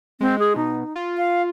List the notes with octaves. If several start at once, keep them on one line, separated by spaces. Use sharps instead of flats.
G#3 C4
G#4
B2 D#4
F4
F5